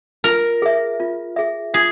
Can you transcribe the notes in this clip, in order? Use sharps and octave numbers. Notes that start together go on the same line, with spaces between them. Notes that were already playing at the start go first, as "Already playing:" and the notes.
F4 A#4
G#4 E5
F4
G#4 E5
F4 G#4